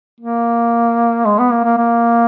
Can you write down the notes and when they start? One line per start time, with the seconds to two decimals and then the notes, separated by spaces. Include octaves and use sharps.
0.21 A#3
1.25 G#3
1.39 B3
1.52 A#3
1.65 A#3
1.78 A#3